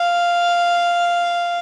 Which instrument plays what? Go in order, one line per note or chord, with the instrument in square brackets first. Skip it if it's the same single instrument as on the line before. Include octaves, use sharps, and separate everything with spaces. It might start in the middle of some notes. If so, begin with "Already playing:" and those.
Already playing: [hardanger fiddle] F5